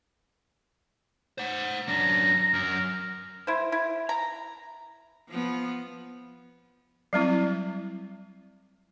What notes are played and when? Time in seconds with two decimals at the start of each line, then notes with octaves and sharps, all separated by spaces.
1.38 C5 F#5
1.88 F#2 D4 A#5
2.54 F#2 A#4
3.47 E4 C5
3.72 E4
4.09 A#5
5.29 F3 B3
7.13 F#3 G3 C4 E4